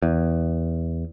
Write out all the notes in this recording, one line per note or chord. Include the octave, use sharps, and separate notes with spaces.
E2